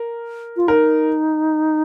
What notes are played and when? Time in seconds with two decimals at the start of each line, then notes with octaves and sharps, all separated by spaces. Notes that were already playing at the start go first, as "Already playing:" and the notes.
Already playing: A#4
0.57 F4
0.68 D#4 A#4